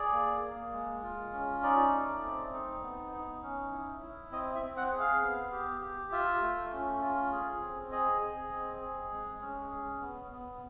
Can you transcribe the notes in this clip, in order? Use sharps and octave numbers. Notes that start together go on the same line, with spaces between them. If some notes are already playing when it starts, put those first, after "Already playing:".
Already playing: G#4 D5
A#3
A#3
G#3
F4
C#4
D#4 D5
A3
C4
D#4
B3
D#4
C#4
E4
E4
C4 D#5
E5
C4
F#5
G#4
F5
B3
G4
G4
F4 E5
A3
C#4
F4
G#4
C4
G#4 D#5
G#4
C4
G#4
G#3
C#4
G#4
B3
B3